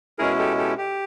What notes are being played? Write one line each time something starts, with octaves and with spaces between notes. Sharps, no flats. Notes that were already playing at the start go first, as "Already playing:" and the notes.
B2 G#3 C#4 E4 G#4 A#4
G4 A4
G4 A4
G4